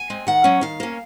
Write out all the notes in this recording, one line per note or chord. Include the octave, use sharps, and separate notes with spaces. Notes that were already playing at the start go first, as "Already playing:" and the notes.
Already playing: G#5
G#3 C4
D#3 F#5
F#3 C#4
D#3 F5
A#3 C#4